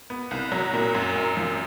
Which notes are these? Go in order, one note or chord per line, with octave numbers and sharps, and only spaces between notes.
B3
C2
F#3
A#2
F#2
F#2
F3